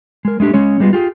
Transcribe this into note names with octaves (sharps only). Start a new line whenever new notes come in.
G#3 A#4
G#3 A3 D4 G4
G#3 C#4 C#5
G3 G#3 B3 F4
F4 G4 G#4